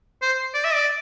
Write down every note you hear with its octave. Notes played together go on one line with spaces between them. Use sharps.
C5
D5
E5
D5